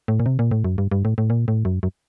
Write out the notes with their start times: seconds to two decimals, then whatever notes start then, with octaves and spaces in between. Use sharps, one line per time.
0.08 A2
0.20 A#2
0.26 C3
0.39 A#2
0.51 A2
0.64 F#2
0.78 G2
0.92 G2
1.05 A2
1.18 A2
1.30 A#2
1.48 A2
1.65 F#2
1.83 F#2